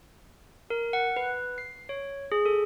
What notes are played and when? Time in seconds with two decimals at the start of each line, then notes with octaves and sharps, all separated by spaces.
0.70 A#4
0.93 F#5
1.16 B4
1.58 C7
1.89 C#5
2.32 G#4
2.46 A4